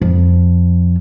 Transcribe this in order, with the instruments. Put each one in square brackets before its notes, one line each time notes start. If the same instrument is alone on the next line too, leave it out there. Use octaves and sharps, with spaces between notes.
[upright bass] F2